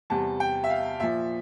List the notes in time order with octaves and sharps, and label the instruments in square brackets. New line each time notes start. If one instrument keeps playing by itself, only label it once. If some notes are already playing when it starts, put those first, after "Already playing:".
[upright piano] E2 C3 G3 A5
G5
E5
F5
A#2 F3 E5